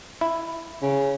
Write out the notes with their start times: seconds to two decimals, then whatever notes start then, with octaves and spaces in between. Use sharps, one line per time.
0.21 E4
0.82 C#3